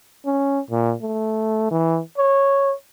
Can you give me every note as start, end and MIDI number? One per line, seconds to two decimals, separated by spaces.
0.26 0.60 61
0.70 0.94 46
1.02 1.68 57
1.71 2.00 52
2.18 2.73 73